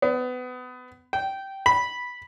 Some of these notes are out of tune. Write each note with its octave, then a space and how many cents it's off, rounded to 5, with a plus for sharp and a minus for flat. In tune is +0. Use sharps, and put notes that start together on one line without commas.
B3 +25
G5 -15
B5 -5